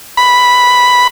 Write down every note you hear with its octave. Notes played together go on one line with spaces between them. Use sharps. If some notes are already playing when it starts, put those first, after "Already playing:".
B5